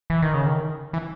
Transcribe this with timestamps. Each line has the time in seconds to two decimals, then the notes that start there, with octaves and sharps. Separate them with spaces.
0.10 E3
0.22 D#3
0.34 C#3
0.46 D#3
0.93 E3